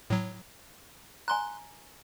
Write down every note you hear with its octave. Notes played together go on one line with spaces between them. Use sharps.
A2 F#3
G#5 A#5 C6 F#6